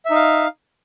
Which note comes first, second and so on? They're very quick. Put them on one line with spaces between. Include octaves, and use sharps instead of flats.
E5 D#4 F5